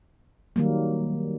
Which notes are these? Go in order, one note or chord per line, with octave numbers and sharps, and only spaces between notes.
D#3 F#3 G3 A#3